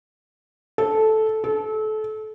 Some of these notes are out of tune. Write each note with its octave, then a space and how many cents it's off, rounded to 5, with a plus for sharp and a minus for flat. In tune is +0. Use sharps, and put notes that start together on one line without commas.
A4 -10
A4 -30